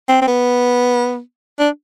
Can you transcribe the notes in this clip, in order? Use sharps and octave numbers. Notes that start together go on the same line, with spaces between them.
C4
C4
B3
D4